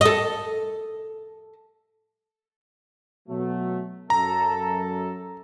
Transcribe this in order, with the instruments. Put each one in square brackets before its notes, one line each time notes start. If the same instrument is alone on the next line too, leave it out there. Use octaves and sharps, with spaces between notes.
[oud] A4 D#5
[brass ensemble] B2 F#3 A3
[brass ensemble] F#2 A4 [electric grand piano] A#5